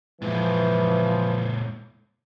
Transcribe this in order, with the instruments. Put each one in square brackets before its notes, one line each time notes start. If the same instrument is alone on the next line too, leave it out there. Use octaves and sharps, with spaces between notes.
[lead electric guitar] A#2 G#3 [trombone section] E3 F3